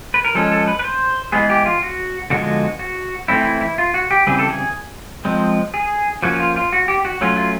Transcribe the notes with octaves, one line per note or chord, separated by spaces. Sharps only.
B4
A#4
F3 G#3 C#4 A4
A4
B4
B4
C5
E3 G#3 B3 G#4
G4
F4
F#4
D3 F3 G#3 B3 F#4
F#4
E3 A3 C4 E4
E4
E4
F4
F#4
G4
C#3 E3 G3 C4 G#4
A4
G#4
F3 G#3 C4
G#4
F3 A#3 C#4 F#4
F4
F4
F#4
G4
F#4
F#3 A3 C#4 F4
F4